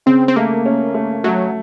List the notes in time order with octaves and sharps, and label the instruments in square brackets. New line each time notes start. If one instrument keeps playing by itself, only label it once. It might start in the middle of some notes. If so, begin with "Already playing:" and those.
[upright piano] C#3 [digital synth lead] C4
[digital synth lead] C4
[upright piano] A3 [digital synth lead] A#3
[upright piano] C#4
A3
[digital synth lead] F#3 [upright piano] A3